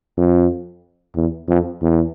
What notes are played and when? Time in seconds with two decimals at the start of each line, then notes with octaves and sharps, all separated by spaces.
0.17 F2
1.16 E2
1.48 F2
1.82 E2